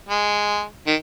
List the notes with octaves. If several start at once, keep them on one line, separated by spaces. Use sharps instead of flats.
G#3
D#3